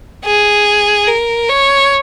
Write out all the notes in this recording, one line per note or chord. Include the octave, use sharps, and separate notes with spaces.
G#4
A#4
C#5